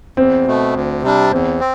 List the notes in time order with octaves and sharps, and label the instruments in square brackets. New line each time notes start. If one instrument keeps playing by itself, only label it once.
[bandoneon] E2 [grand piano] C4
[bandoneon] B2 A3
D2
C3 G3 D4
[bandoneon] E2 [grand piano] C4
[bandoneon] C4